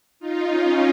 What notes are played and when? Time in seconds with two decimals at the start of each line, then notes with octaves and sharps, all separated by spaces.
0.20 D#4 F4
0.49 C#4 D#4